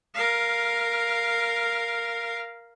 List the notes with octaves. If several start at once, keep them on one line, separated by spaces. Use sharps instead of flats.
A#4 F5